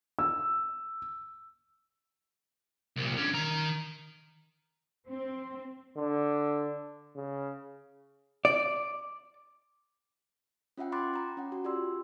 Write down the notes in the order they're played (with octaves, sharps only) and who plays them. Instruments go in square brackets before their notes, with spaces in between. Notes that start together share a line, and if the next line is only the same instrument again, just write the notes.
[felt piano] E6
[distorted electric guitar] C2 A#2
D3 C#4
D#3 A#5
[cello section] C4
[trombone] D3
C#3
[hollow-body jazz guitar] D5
[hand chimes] C#4 F4 E5 F#5 G5
G5 B5 C6 D6 F#6 A6
G5 A#5
C#4 F#5
F#4
F4 G4 D5 G5 C6 E6